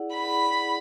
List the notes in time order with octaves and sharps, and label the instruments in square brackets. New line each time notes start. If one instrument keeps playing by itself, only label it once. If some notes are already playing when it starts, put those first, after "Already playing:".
Already playing: [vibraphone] E4 G#4 D5 F#5
[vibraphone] E4 G#4 D5 F#5 [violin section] B5